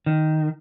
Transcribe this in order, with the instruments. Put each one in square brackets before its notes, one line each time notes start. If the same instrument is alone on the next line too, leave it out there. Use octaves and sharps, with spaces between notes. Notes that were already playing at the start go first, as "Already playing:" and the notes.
[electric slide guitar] D#3